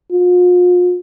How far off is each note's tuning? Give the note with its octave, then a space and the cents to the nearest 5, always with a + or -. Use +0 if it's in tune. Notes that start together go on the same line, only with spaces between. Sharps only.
F4 +40